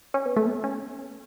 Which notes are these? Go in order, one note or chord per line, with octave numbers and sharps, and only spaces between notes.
C#4
B3
A3
B3
C#4